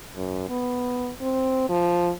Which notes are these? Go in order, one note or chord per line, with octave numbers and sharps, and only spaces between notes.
F#2
B3
C4
F3